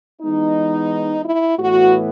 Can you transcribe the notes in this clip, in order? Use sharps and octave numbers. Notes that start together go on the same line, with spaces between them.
E3 G#3 B3 D#4
E4
A2 E3 B3 F#4